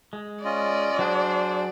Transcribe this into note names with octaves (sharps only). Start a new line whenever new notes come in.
G#3
C#4 F4 D5 D#5
F#3 D4 G#4 C5